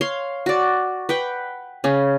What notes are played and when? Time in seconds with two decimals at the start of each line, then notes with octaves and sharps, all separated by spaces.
0.01 C#5 F5 C6
0.46 F#4 D5
1.09 B4 F#5 G5
1.84 C#3 C#4